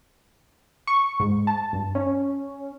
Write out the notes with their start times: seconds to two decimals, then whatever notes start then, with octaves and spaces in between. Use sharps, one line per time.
0.87 C#6
1.20 G#2
1.47 A5
1.73 G2
1.95 C#4